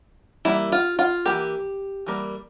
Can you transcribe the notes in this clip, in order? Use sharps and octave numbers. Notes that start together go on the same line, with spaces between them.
E3 G3 A#3 E4
F4
F4
E3 G3 A#3 G4
E3 G3 A#3